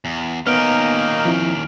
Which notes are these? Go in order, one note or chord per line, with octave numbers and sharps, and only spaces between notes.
E2
D#2 A#3 B3 C#4 D#4 F6 D7
F3 C4 E4